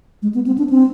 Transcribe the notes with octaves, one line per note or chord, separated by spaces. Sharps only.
G#3
B3
C4
D4
C4